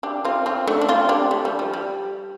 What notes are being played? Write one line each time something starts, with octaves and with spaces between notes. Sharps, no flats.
D4 G4
C4 F4
C4 F4
A3 D4
D4
C4 F4
D4 G4
A3
G3
F3
G3